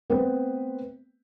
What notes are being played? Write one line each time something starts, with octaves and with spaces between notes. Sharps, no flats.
A3 B3 C4 B4